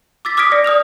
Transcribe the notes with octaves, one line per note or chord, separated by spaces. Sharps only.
D6 E6 A6 B6
D6 D#6 F6 G#6 B6 D7
D5 A#6 C#7
D5 D#6 F6 F7